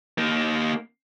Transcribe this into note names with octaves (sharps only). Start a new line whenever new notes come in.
A#3 D#4